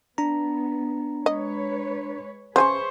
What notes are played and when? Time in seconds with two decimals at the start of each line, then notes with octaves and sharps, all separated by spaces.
0.18 B3 D4 A#5
1.26 G#3 B4 C#5 D#5
2.56 C#3 G#4 B4 C5 G#5 C#6